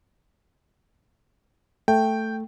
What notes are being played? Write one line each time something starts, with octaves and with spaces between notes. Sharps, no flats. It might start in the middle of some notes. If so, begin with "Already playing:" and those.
A3 G5